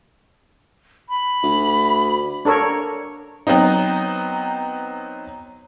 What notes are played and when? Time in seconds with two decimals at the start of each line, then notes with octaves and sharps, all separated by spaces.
1.09 B5
1.43 D2
2.45 D4 A4 A#4 C#5
3.47 F#3 B3 C4 D#4